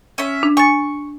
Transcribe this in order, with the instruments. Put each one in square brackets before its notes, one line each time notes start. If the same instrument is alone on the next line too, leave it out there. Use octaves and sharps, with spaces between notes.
[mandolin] C#4 E5
[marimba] D4
[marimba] G#5 A6 [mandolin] C#6